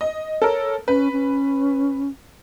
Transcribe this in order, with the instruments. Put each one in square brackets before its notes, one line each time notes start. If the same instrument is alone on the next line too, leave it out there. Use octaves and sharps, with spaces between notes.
[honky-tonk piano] D#5
[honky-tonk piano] A4 A#4 [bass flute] C#5
[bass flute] C#4 [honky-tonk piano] B4
[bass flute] C#4